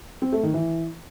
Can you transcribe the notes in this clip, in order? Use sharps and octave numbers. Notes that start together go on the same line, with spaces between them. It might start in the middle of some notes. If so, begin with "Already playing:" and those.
C4
A3
D#3
E3